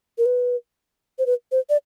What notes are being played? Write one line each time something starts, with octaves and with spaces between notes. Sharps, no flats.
A#4
B4
C5
B4
C5
D5